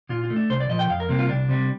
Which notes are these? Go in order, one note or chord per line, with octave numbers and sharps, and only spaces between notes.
A#2 F4
F4
A3
D4
C2 C5
D5
A#2 F3 D#5
G5
F2 F5
A#4
C3 G3 A#3
F4
C2 D4
C3 G3